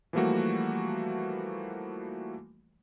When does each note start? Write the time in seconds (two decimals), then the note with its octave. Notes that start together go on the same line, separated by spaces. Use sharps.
0.13 E3 F3 G3 A3 A#3 F#4